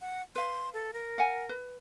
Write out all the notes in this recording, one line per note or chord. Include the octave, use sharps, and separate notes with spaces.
F#5
B4 F5 C6
A4
A#4
F5 F#5 G#5
B4